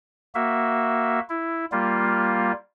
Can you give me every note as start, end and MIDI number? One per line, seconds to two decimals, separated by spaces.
0.35 1.20 58
0.35 1.20 66
0.35 1.20 76
1.29 1.65 64
1.72 2.52 55
1.72 2.52 58
1.72 2.52 65